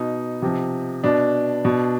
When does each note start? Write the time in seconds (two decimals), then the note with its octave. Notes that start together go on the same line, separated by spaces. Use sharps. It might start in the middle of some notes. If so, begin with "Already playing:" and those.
Already playing: B2 D#4
0.42 C3 F3
1.04 B2 D4
1.65 B2